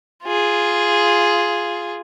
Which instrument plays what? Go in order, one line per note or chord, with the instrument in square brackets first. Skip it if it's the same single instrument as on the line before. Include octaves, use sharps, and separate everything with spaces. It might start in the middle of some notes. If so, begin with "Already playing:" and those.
[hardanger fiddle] F4 G#4